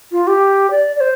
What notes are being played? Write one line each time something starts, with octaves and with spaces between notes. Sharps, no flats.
F4
G4
D5
D5
C5